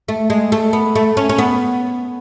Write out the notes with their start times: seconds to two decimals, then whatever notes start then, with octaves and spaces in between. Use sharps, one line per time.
0.08 A3
0.30 G#3
0.52 A3
0.73 B3
0.95 A3
1.17 C#4
1.29 C#4
1.38 B3